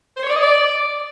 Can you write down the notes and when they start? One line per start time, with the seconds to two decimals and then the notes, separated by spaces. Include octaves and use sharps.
0.17 C5
0.23 C#5
0.29 D5
0.34 D#5
0.40 D5